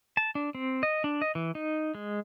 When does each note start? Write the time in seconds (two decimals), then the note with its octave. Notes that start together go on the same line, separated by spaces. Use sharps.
0.17 A5
0.35 D4
0.55 C4
0.83 D#5
1.04 D4
1.22 D#5
1.35 E3
1.55 D#4
1.95 G#3